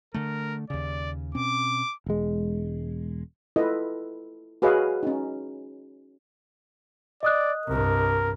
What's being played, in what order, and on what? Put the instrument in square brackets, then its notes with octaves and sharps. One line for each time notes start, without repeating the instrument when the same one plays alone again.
[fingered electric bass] D3 A3 [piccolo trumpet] A#4
[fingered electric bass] D#2 C#3 [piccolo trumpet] D5
[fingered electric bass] B2 C4 C#4 [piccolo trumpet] D6
[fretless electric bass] E1 G#3
[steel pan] E4 F4 A4 B4 D#5
F#4 G#4 B4 C#5 D#5 F5
C#4 D#4
[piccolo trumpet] D5 [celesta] D#5 D#6 F#6
[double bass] C2 G2 [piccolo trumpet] A#4